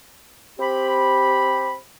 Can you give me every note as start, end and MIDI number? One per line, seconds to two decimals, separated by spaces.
0.60 1.73 60
0.60 1.73 67
0.60 1.73 83